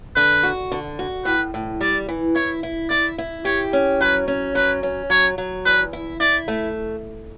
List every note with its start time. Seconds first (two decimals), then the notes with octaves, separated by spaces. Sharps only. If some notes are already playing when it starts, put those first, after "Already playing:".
0.16 D3 B4
0.43 F#4
0.72 D3
0.99 F#4
1.25 A2 B4
1.54 A2
1.81 G3 D5
2.08 E3
2.35 E4 C#5
2.63 E4
2.90 E4 D5
3.18 E4
3.45 G4 C#5
3.73 C#4
4.01 F#3 B4
4.28 C#4
4.55 F#3 B4
4.83 C#4
5.10 F#3 C#5
5.38 F#3
5.66 E2 B4
5.93 E4
6.20 E4 D5
6.48 A3